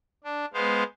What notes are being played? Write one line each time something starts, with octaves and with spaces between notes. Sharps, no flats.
D4
G#3 B3 C5 F5